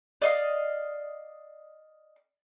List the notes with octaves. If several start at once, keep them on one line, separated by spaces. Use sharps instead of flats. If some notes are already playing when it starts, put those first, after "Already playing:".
D5 D#5 F5